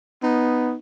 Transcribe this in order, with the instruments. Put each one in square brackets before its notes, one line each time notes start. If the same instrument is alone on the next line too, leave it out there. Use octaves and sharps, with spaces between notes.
[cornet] B3 [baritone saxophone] D#4